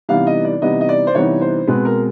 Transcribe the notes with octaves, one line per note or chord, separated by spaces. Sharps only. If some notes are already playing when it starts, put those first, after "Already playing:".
C3 E3 G3 B3 D#4 F5
D#5
D5
C3 E3 G3 B3 D#4 D#5
D#5
D5
C5
C3 E3 G3 B3 D#4 C#5
C5
B2 G#3 C4 B4
A#4